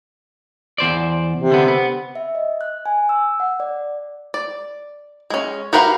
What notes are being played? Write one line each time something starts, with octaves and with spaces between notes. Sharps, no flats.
E2 C5 D5
C3
D3 B3
B3
E5
D#5
F#6
G#5
E6
F#5
D5
D5
G#3 C#4
F#4 G4 A#4 B4 F5